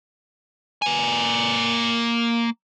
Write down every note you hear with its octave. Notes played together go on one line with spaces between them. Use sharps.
A#3 G#5